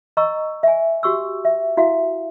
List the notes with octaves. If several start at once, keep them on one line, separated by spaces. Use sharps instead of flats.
D#5 A#5 C#6 E6
E5 G#5
F#4 G4 C#6 E6
E5
E4 F#4 E5 F5